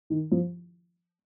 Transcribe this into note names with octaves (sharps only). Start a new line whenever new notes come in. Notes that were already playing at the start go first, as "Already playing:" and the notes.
D#3
F3